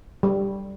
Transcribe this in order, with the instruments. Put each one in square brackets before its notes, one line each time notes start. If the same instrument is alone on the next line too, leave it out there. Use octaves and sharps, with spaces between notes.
[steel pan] G3